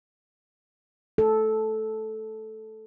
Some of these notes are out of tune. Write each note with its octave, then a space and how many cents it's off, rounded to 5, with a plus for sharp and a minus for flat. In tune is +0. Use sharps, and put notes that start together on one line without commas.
A4 -10